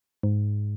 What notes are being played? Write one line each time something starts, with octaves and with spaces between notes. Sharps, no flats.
G#2